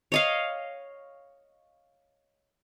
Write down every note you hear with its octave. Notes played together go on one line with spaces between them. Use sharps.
C#5 D#5 F5